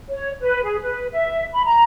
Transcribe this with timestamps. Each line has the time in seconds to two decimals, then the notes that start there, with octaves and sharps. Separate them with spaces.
0.09 C#5
0.40 B4
0.62 G#4
0.81 B4
1.11 E5
1.53 B5
1.65 A#5